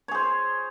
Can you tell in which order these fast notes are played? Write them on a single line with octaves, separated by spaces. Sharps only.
C#5 G#4 C5